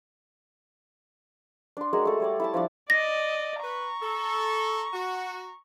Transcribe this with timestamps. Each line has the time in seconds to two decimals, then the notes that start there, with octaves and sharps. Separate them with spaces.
1.77 D4 C6
1.93 G#3 F#4 A#4 C#5
2.05 A3 A4
2.20 G3 C#5 D5
2.40 E4 E5 A5
2.54 F3 D4 E4 D5
2.90 D5 D#5 A#6
3.64 B4 A#5 C#6
4.02 A4
4.94 F#4